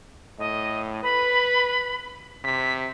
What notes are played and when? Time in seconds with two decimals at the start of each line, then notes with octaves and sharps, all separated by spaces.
0.39 A2 D#5
1.03 B4 B5
2.44 C3 B6